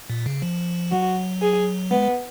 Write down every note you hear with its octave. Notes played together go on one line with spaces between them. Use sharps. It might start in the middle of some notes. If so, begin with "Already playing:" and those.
A#2
C#3
F3
F#3 F#4
G#4
G#3 B3